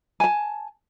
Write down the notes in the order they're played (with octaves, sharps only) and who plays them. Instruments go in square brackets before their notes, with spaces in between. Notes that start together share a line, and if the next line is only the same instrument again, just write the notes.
[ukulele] G#5 A5